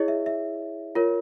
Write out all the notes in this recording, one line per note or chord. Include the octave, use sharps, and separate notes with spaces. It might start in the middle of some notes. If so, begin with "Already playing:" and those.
Already playing: E4 G#4 C#5 D#5
E5
E5
F4 A#4 C#5